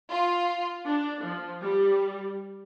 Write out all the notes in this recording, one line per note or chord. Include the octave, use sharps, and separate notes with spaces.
F4
D4
F3
G3